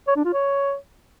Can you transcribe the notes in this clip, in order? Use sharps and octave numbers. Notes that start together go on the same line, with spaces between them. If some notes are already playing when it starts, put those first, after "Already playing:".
C#5
D4
F4
C#5